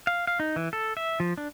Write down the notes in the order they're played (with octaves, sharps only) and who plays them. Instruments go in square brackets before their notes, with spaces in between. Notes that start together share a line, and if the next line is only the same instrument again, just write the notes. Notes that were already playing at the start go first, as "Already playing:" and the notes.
[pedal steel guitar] F5
F5
D#4
E3
A4
E5
F3
D4